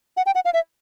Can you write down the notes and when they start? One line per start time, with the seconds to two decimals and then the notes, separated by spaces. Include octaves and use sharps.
0.17 F#5
0.26 G5
0.35 F#5
0.45 F5
0.54 E5